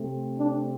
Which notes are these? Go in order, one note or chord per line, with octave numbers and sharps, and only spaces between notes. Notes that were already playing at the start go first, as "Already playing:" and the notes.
Already playing: C3 A3 C4
D4